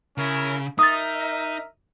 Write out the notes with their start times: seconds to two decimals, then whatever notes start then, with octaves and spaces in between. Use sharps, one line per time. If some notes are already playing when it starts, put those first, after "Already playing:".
0.18 C#3 C#4 E4 A#4
0.79 D#4 A#4 E5 D#6 A6